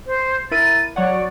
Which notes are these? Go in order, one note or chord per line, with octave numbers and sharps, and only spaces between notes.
C5
E4 A#4 A6 D#7
F#3 C#5 D5 F#5